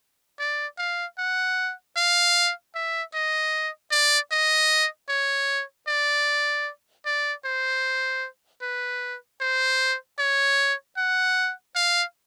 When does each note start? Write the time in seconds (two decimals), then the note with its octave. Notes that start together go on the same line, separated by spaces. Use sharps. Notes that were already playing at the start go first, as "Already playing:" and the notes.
0.39 D5
0.78 F5
1.18 F#5
1.97 F5
2.75 E5
3.14 D#5
3.91 D5
4.31 D#5
5.09 C#5
5.88 D5
7.06 D5
7.45 C5
8.62 B4
9.41 C5
10.19 C#5
10.97 F#5
11.76 F5